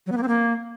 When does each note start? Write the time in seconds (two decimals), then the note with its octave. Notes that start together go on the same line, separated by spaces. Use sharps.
0.07 F#3
0.12 B3
0.17 A#3
0.23 C4
0.28 A#3